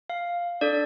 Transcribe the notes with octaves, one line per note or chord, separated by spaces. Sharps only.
F5
D4 A4 D5